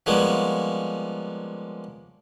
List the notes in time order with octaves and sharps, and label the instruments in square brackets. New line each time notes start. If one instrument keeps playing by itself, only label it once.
[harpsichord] F3 G3 G#3 A#3 B3 C#4